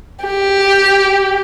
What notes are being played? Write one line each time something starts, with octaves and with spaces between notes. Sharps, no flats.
G4